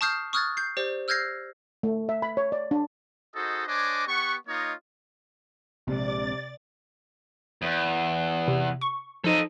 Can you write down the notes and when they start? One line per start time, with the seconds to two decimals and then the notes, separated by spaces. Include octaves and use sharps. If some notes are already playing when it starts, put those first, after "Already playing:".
0.01 A5 C#6 D#6 F6 G6 C7
0.33 C#6 D#6 F6 F#6 G#6 A6
0.57 G6 C7
0.77 G4 C5 D5
1.08 E6 F6 G6 G#6 A#6 C7
1.83 A3
2.09 E5
2.22 B5
2.37 C#5
2.52 D5
2.71 D4
3.35 D#4 F#4 G#4 A4 C5 D#5
3.67 D4 C5 C#5 D#5 G#5 D6
4.06 B3 G4 F#5 C#6
4.47 A#3 D#4 F4 C#5 D#5
5.87 A#1 C3 G#3 D5 A6
7.62 E2
8.48 C3
8.81 C#6
9.24 F3 D#4 A4 D#5